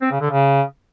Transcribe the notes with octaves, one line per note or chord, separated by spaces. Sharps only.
C4
C#3
D3
C#3